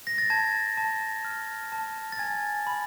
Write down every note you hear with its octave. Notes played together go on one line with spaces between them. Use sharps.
A#6
A6
A5 G#6
A5
F6
A5
A6
G#5 G#6
B5